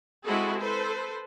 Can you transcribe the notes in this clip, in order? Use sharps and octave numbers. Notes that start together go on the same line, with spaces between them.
G#3 C4 E4 F#4 G#4 A4
A4 B4 C5